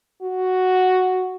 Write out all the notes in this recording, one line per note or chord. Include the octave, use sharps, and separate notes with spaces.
F#4